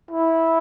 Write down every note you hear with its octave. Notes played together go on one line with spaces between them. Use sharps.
E4